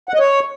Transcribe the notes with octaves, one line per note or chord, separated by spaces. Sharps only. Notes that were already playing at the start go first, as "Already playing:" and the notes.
F#5
D#5
C#5